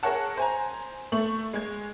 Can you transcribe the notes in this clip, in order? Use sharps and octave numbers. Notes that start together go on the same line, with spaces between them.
G#4 A#4 C#5 F#5 A5
C5 G#5 A#5
A3 C#6 F#7
G#3 G#6